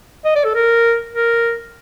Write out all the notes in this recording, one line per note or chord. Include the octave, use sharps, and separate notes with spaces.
D#5
D5
A4
A#4
A#4